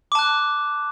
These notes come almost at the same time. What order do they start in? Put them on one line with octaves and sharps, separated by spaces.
D6 A5 F#6